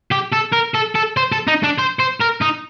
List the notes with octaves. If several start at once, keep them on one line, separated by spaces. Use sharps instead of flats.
G4
A4
A#4
A4
A4
C5
A4
D#4
D4
C5
C5
A#4
D#4